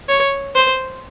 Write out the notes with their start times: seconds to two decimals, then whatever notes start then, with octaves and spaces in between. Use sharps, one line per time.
0.08 C#5
0.55 C5